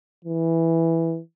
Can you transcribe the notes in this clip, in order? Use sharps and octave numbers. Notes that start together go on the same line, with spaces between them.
E3